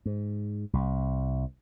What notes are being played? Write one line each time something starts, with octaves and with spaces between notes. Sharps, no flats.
G#2
C2